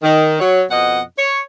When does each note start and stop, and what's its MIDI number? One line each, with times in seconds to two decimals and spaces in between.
0.02 0.40 51
0.40 0.63 54
0.40 0.63 73
0.71 1.01 41
0.71 1.01 47
0.71 1.01 75
0.71 1.01 78
1.18 1.40 73